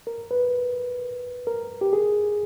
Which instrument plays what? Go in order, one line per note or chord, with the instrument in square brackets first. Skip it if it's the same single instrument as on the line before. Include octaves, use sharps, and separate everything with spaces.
[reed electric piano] A#4
B4
A#4
G4
G#4